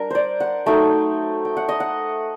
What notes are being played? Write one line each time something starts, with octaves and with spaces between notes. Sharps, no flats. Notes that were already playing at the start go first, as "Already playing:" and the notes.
Already playing: G3 D4 A#4
C5 D5
F#5
F#3 A3 D#4 G5
G5
F#5
D#5
F#5